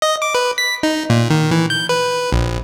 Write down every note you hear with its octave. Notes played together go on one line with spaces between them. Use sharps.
D#5
D6
B4
B6
D#4
A#2
D#3
E3
G6
B4
A#1